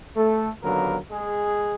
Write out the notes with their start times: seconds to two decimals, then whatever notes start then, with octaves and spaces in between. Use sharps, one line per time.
0.17 A3 A4
0.63 D#2 D3 F#3 A#3 B3 A#4
1.10 G#3 G#4